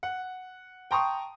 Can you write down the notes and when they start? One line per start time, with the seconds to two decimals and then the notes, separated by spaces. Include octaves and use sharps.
0.03 F#5
0.91 G5 A5 A#5 C6 C#6 D#6